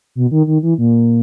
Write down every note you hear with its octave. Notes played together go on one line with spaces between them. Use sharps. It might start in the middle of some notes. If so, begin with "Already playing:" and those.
B2
D#3
D#3
E3
A#2